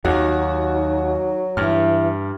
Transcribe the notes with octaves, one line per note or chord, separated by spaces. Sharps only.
D#2 F#3 D#4 F#4
G2 E3 F6